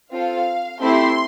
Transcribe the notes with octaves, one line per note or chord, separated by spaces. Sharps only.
C4 F4 A4 F5
A3 C4 E4 G4 C6